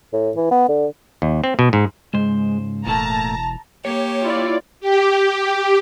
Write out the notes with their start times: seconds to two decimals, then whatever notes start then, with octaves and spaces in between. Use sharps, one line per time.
0.13 A2
0.36 E3
0.51 B3
0.69 D3
1.22 D#2
1.44 C4
1.59 B2
1.73 G#2
2.14 C#2 G#2 G#3 C5
2.87 E1 A2 A3 A#3 A5 A#5
3.85 A#3 G4 C#5
4.23 E4 F4 D5
4.80 G4